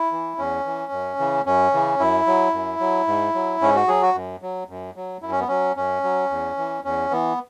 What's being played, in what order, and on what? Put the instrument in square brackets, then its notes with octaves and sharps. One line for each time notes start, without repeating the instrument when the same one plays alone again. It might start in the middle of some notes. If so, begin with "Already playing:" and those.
Already playing: [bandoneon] E4
E3
E2 C#4
E3
F#2
C#3 E3
F#2 C#4
C#3 E3
F#2 E4
F#3
F#2
F#3
G#2
F#3
G#2 C#4
F#4
F#3 G#4
F#4
F#2
F#3
F#2
F#3
F#2 E4
C#4
B3
F#3 C#4
F#2 C#4
F#3
E2
E3
E2 C#4
E3 B3